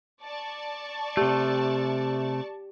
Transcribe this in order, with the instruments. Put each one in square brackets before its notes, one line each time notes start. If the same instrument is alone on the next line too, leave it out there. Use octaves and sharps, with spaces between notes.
[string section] D5 A5 C#6
[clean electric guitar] C3 A3 [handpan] G4